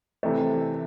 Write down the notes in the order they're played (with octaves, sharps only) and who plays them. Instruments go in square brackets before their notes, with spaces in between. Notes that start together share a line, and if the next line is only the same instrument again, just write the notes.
[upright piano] C3 E3 A3